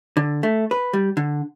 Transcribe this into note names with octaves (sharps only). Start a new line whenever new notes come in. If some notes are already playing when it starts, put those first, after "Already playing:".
D3
A3
B4
G3
D3